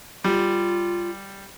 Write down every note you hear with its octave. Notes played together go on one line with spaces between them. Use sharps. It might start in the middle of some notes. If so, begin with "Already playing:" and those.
G3 F4